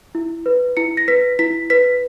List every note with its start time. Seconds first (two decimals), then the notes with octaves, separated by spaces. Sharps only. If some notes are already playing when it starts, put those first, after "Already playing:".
0.15 E4
0.46 B4
0.77 E4 C#7
0.97 A#6
1.08 B4 B6
1.39 E4 B6
1.70 B4 B6